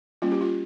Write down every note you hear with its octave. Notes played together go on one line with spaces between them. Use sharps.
G3 A#3 C#4 F4
G4
F4